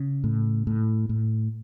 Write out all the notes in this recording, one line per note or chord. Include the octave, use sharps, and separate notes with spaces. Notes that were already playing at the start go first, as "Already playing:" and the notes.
Already playing: C#3
A2
A2
A2